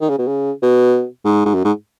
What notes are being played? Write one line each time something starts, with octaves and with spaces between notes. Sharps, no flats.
D#3
C#3
B2
C#3
B2
G#2
G#2
F#2
G#2